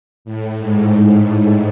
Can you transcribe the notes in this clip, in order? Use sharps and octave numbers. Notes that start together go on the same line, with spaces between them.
A2
G#2